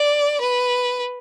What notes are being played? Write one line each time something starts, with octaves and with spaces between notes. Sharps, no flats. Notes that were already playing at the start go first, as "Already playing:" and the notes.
Already playing: D5
B4